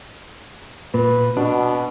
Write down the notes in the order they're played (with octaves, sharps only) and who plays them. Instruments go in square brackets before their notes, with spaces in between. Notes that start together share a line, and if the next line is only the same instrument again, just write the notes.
[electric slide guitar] A#2 [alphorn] B4
[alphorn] B2 [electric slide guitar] D4